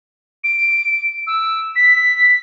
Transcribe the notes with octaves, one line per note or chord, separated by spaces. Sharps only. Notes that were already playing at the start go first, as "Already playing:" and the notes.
D7
E6
B6